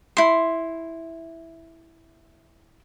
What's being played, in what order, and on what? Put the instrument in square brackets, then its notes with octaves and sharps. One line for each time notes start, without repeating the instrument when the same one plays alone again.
[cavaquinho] E4 C6